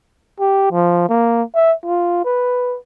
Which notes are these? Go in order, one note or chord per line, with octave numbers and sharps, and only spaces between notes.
G4
F3
A#3
E5
F4
B4